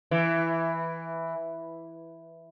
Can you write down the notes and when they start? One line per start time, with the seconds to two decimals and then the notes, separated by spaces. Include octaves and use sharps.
0.11 E3